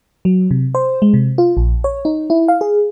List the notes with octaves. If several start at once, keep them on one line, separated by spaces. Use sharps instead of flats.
F#3
C3
C5
G#3
C3
F4
A#1
C#5
D#4
E4
F5
G#4